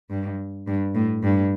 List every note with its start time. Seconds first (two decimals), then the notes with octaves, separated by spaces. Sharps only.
0.10 G2
0.67 G2
0.95 A2
1.24 G2